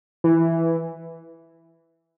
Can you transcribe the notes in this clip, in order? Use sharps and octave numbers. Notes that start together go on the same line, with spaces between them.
E3